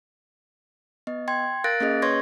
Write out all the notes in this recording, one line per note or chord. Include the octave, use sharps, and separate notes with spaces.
B3 D#5
G5 C6 G#6
A#4 F5 F#6 A6 A#6 D7
A#3 C#4 G#4 D#5
B4 C#5 C6 C#6 G#6 A#6